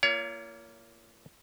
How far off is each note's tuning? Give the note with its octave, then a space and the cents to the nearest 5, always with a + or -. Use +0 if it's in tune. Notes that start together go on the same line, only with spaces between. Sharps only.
A#3 +0 F4 -40 C#5 +30